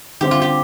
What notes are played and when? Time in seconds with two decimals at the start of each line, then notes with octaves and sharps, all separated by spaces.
0.21 D3 G3 C4 G4
0.31 F4
0.42 G4